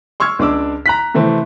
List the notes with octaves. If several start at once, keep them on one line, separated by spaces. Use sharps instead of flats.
C6 C#6 E6 F6 G#6
C#2 D4 D6 E6
A#5 F#6 B6
C3 E3 A3 C4